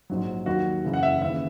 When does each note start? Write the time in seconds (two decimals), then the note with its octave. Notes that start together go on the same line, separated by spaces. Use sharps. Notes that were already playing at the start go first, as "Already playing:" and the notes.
0.10 A#1 G#2 F#3
0.46 D#2 D#3 F#3 F#4
0.85 F#1 F#2 C#3 E3
0.94 F#5
1.03 E5
1.21 D#2 C#3 E3 E5